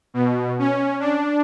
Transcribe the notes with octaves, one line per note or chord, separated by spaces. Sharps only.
B2
C#4
D4